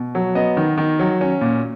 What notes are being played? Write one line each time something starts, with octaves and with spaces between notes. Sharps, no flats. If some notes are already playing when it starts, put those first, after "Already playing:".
Already playing: B2
F#3
B3 D#5
D#3
D#3
F#3
C#4
A#2